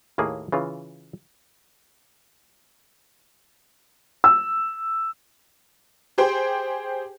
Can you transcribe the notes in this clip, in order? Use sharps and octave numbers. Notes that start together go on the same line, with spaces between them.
D#2 A2 A#3 G#4
C#3 E3 F4
E6
G4 G#4 C5 G5